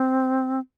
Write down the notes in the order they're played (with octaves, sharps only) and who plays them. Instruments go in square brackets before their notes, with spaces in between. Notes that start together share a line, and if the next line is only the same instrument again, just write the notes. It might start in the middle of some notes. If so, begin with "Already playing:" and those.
Already playing: [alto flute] C4